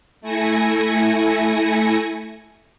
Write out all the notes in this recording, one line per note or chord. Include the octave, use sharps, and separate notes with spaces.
A3 E4 G#5 A#6 C#7